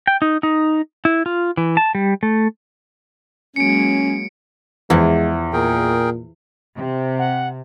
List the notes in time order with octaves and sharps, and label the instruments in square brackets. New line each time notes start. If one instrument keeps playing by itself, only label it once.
[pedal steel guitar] G5
D#4
D#4
E4
F4
E3
A5
G3
A3
[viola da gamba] F#3 G#3 A#3 [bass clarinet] C#4 [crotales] C#7 D7
[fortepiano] E2 [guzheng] E3 F3 [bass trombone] G#3
[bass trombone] A#2 [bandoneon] G#4 A#4 G5
[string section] C3
[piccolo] F#5